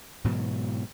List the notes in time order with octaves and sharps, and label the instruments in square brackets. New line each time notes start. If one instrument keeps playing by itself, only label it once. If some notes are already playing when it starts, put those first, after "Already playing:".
[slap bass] G#2 B2 E3 F#3